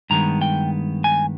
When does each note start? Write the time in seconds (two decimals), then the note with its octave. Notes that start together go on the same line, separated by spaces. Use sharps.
0.10 G2 D#3 G#3 B3 A#5
0.41 G5
1.04 G#5